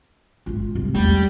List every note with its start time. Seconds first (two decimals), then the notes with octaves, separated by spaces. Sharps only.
0.46 G#1 F4
0.75 C2
0.95 E2 G3 A3